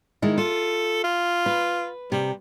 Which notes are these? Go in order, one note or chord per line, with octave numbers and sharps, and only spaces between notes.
D#3 G#3 E4
F4 A4
F4
B4
C3 G3